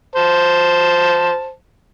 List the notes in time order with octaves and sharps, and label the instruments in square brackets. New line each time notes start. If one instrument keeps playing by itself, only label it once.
[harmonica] C5 A5